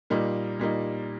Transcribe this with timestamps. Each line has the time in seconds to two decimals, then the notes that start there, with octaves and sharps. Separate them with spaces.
0.10 A#2 G3 A#3 D#4
0.59 A#2 G3 A#3 D#4